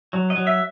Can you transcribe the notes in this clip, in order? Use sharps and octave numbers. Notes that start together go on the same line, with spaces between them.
F#3
D#5
F#3
E5